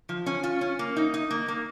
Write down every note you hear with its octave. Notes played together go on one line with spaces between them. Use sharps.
F3
C#4
F4
C#4
A#3
D#4
D#4
A#3
A#3